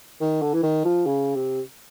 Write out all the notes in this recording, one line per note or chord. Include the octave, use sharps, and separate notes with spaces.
D#3
D3
E3
D#3
F3
C#3
C3